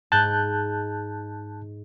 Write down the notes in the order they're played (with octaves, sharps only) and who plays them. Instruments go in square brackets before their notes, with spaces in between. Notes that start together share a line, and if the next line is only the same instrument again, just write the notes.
[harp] G#2 [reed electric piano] A5 F#6 G6